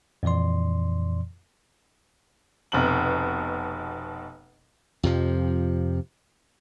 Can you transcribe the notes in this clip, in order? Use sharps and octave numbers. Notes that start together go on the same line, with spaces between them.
F2 A#2 E3 D5 C6
F1 B2 F#7
F2 C3 F3